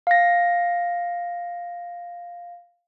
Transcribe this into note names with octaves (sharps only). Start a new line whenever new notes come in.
F5 A#6